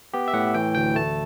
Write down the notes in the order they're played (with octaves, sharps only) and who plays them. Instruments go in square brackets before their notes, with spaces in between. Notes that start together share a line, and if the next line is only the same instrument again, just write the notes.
[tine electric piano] B3 G4
E5
A2 F#5
E3 G5
D2 G5
A3 A5